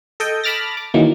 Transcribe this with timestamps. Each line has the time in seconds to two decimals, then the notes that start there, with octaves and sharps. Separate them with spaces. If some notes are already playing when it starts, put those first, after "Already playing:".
0.20 A4 D#5 G5
0.44 A5 B5 D6 F6 A6 A#6
0.77 D6
0.94 D#3 E3 F#3 A#3